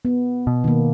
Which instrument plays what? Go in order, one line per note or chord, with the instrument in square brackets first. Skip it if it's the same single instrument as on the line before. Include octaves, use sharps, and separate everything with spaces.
[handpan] B3
[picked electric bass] B2
[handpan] D#3 A#3